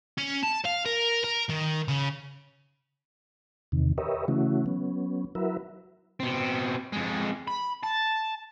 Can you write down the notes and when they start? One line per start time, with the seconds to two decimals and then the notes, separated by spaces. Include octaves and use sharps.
0.18 C#4
0.43 A5
0.65 F5
0.86 A#4
1.24 A#4
1.50 D#3
1.88 C#3
3.72 E2 C3 D#3
3.98 G4 A#4 B4 C#5 D#5 E5
4.28 C#3 E3 A3 C#4 E4 F#4
4.66 F#3 B3 C#4
5.35 F#3 E4 F#4 A#4 B4 E5
6.20 B2 C4
6.93 F2 G#3
7.48 B5
7.84 A5